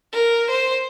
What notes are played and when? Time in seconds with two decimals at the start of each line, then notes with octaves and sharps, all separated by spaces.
0.12 A#4
0.50 C5